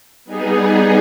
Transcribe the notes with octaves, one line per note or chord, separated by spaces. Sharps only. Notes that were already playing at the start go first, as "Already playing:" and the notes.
G3 B3 D#4 G#4